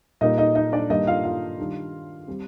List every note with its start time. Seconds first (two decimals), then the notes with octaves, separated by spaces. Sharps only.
0.21 A#2 G3 A#3 D#4 D#5
0.38 D#4 D#5
0.55 D#4 D#5
0.72 D4 D5
0.90 G2 D#3 G3 A#3 D#4 D#5
1.07 F4 F5
1.24 F4 F5
1.59 D#3 G3 D4
2.28 G3 C4